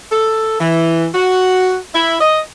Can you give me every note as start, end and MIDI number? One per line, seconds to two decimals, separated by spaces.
0.11 0.59 69
0.60 1.07 52
1.14 1.77 66
1.94 2.16 64
2.21 2.41 75